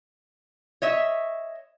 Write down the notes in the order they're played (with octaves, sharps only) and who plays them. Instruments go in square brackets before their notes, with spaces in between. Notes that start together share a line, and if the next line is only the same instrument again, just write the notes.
[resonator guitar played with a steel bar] C#5 D#5 E5